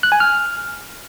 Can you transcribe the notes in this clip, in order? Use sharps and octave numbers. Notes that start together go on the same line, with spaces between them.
F#6
G#5
F6